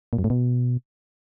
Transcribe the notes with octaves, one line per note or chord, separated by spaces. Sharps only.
A#2
F#2
A2
B2